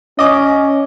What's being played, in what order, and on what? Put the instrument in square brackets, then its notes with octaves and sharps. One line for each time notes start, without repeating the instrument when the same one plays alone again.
[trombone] C#4 [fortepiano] D#5 D6